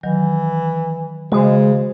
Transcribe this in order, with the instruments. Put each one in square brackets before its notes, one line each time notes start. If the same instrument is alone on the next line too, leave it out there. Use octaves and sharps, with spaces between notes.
[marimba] D#3 F#3 [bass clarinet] E3
[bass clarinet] C#3 [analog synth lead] G#3 [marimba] F#4 C5